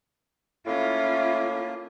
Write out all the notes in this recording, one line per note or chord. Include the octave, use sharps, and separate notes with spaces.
A2 A#3 C#4 E4 F4